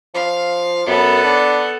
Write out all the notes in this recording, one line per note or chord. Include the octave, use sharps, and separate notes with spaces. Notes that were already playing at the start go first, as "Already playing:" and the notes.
F3 F5
F#2 B3 A4
D4